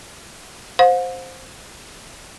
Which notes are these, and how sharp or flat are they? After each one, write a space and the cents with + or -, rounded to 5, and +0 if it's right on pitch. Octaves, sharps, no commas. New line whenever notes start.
C5 +0 F5 +45